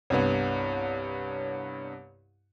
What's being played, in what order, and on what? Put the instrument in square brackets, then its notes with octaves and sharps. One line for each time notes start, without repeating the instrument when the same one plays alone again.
[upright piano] C2 G2 B3 [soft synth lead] C#5